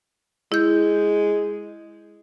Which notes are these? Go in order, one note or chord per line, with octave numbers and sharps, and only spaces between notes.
G#3 E4 G6